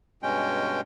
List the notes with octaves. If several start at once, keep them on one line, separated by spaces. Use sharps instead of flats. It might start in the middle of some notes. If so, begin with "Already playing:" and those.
G2 B2 G#3 C#4 G5